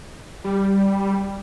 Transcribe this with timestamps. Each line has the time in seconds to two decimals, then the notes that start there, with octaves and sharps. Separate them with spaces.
0.44 G3